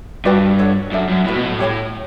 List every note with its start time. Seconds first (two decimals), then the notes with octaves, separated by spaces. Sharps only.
0.25 G2 F#4 B4 D5 G5
0.59 A4 C#5 F#5
0.92 F#2 D4 A4 E5
1.09 F#2
1.26 A2 F#4 B4 F#5 B5
1.35 B2
1.45 A2
1.59 G4 C#5 G5 B5